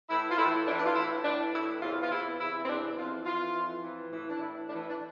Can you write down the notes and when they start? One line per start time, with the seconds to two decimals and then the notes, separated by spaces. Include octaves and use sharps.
0.09 A2 E3 E4
0.30 F4
0.38 A2 E3 E4
0.66 A2 E3 D4
0.76 D4
0.86 F4
0.95 A2 E3 E4
1.24 A2 E3 D4
1.53 E3 E4
1.57 A2
1.82 E2 C3 E3 F4
2.02 F4
2.10 E2 C3 E3 E4
2.39 E2 C3 E3 E4
2.64 C4
2.68 E2 C3 E3 D4
2.97 F2 E3 F4
3.26 F2 E3 F4
3.54 F2 E3
3.83 F2 E3
4.12 A2 E3
4.30 D4
4.40 A2 E3 E4
4.69 A2 E3 D4
4.79 E4
4.89 D4